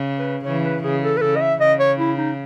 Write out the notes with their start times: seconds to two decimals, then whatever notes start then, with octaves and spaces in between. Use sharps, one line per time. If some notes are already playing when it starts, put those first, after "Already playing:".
Already playing: C#3
0.19 B4
0.44 C#3 E3 C#5
0.64 B4
0.83 C#3 G#4
1.02 A4
1.17 B4
1.21 C#3 A4
1.36 D#5
1.41 E5
1.60 C#3 D#5
1.79 C#5
1.99 E4
2.18 D#4